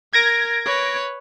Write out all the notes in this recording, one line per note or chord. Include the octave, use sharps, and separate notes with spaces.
A#4 G#6 A#6 D7
B4 C#5